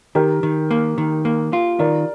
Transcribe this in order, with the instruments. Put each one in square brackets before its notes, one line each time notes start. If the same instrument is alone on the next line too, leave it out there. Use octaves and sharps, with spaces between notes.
[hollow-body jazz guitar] D#3 [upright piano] G4 A#4
[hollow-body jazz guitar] D#3
A#3
D#3
A#3
F4
[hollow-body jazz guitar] D#3 [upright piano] A#4 D5